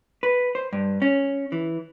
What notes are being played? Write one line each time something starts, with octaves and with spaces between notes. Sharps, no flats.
B4
C5
G2
C#4
E3